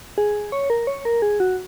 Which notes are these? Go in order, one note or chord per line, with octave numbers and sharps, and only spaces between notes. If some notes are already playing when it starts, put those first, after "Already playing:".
G#4
C#5
A#4
C#5
A#4
G#4
F#4